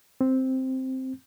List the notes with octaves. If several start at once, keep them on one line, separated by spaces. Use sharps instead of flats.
C4